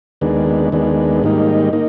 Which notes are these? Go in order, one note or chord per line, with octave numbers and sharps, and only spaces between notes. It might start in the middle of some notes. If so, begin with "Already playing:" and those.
D#2 D#3 G#3 B3 D4
D#2 D#3 G#3 B3 D4
G#2 D#3 G3 A#3 D#4
A#3 D#4